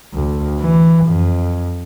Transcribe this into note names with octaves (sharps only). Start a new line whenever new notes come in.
D2
E3
F2